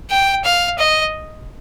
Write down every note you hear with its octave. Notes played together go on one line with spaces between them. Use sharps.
G5
F5
D#5